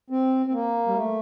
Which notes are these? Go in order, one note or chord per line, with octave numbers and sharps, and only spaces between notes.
C4
C4
A#3
G3
A3